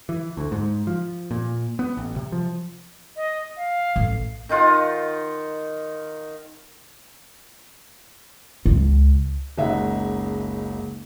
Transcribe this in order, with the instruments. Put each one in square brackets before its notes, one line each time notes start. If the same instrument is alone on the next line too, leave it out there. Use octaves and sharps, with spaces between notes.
[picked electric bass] E3
D2
G#2
F3
A#2
B3
A1
C3
F3
[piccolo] D#5
F5
[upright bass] A1
[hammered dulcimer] D#3 D#4 F4 F#5
[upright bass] C#2
[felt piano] F#1 C#2 G#3 D#4 E5 F#5